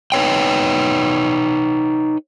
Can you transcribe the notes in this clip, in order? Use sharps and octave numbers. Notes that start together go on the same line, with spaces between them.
D#4 B4 C#5 G5